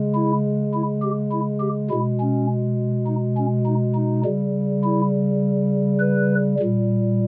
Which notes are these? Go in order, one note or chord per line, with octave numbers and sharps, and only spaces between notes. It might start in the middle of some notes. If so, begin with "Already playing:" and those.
Already playing: C#3 G#3
E4
E4
G4
E4
G4
B2 G#3 E4
C#4
D#4
C#4
D#4
D#4
C#3 G3
E4
B4
A#2 G3